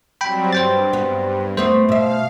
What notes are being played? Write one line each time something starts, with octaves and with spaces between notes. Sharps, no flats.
F#3 G3 C4 G5 B5
G2 C5 G5 A6
B3
A3 B3 C4 C5
B2 E5 F5